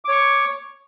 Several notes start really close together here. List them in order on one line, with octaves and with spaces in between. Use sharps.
D6 C#5 C#6